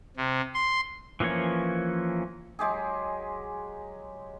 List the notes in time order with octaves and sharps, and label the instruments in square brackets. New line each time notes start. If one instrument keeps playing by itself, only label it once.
[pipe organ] C3
C6
[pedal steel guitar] E3 F3 A#3 C#4 C#5
[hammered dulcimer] F#3 G#3 G4 G#4